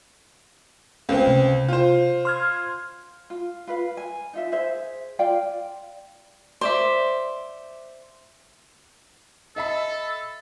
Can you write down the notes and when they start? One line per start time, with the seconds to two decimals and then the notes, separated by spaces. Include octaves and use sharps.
1.09 C#2 A3 C4 B4 F5
1.27 C3
1.68 F4 C5
2.25 C6 F6 G#6
3.30 F4
3.67 F4 B4 F5
3.97 G#5
4.33 D#4 F4 E5
4.52 G#4 C5 E5
5.19 F4 D5 F5 G5
6.61 C5 D5 E5
9.56 A4 D#5 E5 B5